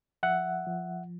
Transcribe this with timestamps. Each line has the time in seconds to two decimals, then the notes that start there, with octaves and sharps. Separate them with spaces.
0.23 F3 E5 F#5
0.67 F3